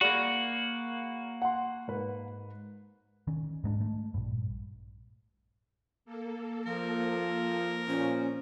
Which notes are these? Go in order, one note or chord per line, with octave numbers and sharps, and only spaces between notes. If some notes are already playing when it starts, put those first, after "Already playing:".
A#3 F#4 G#4 D5 B5
F#5 C6
G#2 B4
D#3 C#4
G#2 G#3 D4
A3
A#1 G2
A#3 A4
F3 A#4
A#2 F3 C#4